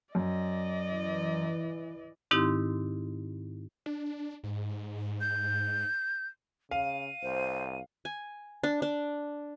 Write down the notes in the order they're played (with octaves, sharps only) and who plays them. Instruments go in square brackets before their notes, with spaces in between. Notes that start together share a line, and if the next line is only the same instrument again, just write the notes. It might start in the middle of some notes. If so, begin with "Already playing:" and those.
[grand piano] F#2 [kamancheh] D5 D#5
[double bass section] E3
[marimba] G#2 D#3 C4 D#4 E4 G4
[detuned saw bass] D4
G#2
[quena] G6
[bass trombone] C#3 [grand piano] F5 [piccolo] D#7
[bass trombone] C2 [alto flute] C5
[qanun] G#5
D4
D4